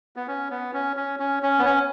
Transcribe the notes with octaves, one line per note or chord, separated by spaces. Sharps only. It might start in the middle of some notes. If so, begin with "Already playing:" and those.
B3
C#4
B3
C#4
C#4
C#4
C#4
B3
C#4